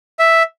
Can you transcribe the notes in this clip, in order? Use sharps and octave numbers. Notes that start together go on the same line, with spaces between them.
E5